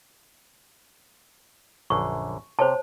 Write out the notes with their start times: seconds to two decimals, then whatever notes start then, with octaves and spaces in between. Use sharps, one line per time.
1.90 A#1 F#2 D3 C#6
2.59 C3 C5 C#5 A5